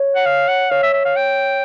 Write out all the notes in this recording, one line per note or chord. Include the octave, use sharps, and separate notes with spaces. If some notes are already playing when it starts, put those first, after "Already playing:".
Already playing: C#5
F#5
F5
F#5
C#5 F5
E5
E5
F5
G5